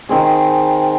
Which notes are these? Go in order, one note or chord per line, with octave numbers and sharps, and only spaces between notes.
D#3 C4 G#4